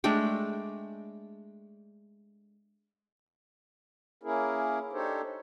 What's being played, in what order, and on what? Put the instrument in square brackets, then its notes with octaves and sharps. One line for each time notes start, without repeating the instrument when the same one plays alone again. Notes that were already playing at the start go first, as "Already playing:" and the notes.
[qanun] G#3 A3 D4 G5
[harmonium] A#3 C#4 E4 G#4 A#4
D4 D#4 G4 A4 C5 C#5